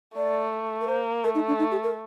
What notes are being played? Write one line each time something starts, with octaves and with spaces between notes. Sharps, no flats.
A3 D5
A#4
A#3 C5
A3 A#4
D#4
D4
D#4
G4
A#4